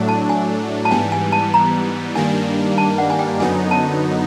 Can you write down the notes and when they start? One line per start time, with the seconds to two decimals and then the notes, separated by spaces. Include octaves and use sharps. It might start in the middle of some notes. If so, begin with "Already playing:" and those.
Already playing: A2 F#3 A3 D4
0.09 A5
0.29 G#5
0.85 A5
0.91 G#2 E3 G3 B3 G#5
1.12 G#5
1.32 A5
1.54 A#5
2.15 G2 D#3 G3 A#3 D4 G#5
2.78 A5
2.98 F#5
3.10 G#5
3.19 G5
3.40 F#2 D3 F#3 B3 D#4 G#5
3.71 A5